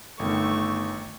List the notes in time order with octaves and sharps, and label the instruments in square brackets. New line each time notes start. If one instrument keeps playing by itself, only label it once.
[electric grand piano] G1 D#3 [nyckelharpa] A3 C#6